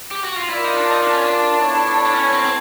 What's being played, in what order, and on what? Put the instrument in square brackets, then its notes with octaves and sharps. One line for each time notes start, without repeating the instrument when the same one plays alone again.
[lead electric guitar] G4
F#4
F4
[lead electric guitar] E4 [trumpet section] F4 A#4 D5
[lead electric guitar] D#4
D4
D#4
D4
C#4
D4
[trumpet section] B3 E4 A4 C#5
[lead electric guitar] D4
C#4
C4
C4